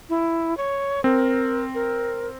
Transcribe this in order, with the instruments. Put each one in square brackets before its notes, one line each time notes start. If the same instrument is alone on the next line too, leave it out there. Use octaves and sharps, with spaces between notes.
[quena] E4
C#5
[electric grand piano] C4 [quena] A#4
[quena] A#4